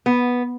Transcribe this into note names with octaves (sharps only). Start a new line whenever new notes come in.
B3